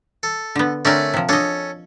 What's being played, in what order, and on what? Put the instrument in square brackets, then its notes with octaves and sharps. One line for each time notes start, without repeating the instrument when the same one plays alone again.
[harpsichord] A4
[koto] D3 B3
[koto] D3 C4 A#4 [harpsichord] A3 C#4 D5
[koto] C3 F3
[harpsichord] C#4 A4 [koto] D4 D#5